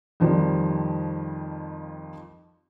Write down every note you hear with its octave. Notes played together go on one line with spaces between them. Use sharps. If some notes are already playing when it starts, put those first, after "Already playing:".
F2 D#3 F3 G3